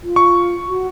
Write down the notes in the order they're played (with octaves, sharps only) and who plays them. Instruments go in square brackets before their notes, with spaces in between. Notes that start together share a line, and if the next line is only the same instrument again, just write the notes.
[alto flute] F4
[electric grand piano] C#6
[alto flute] F#4